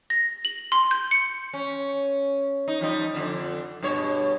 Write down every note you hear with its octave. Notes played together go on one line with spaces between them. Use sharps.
A#6
F#7
C6
G6
C#7
C#4
D#4
F3 G3 D#4
F2 D3
G2 B2 C#5